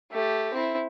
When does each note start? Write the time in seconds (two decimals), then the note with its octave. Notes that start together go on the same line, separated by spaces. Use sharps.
0.12 A3 G4
0.54 C4 E4